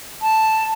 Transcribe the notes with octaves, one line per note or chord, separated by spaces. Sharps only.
A5